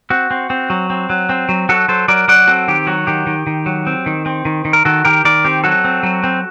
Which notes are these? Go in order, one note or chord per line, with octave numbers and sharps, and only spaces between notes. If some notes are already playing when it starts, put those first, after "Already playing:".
C4 F#4
C4
C4
F#3
C4
F#3
C4
F#3
F#3 F#4 A4
F#3 A4 C5
F#3 A#4 D5
F#3 D5 F#5
C4 F#4 A4
D#3 G4
F#3 F#4
D#3 G4
D#3
D#3
F#3
C4
D#3
C4
D#3
D#3
A#4
D#3 F#4 A4
D#3 G4 A#4
D#3 A#4 D5
C4 G4
F#3 F#4 A4
C4
F#3
C4